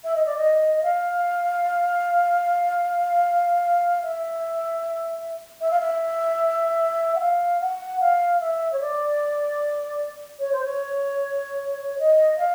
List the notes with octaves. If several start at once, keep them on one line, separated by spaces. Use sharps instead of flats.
E5
D#5
D5
D#5
F5
E5
E5
F5
E5
F#5
F5
F#5
F5
E5
C#5
D5
C#5
C5
C#5
D#5
F5